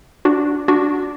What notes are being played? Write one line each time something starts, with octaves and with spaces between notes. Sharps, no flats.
D4 F#4
D4 F#4